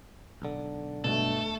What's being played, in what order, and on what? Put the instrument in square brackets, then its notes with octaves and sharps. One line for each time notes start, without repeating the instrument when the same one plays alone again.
[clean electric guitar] B1 D3
[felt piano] G2 B2 [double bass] A3 [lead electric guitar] A4